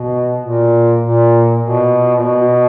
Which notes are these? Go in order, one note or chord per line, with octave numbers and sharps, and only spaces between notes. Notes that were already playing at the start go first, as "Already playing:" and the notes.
Already playing: B2
A#2
A#2
B2
A#2
B2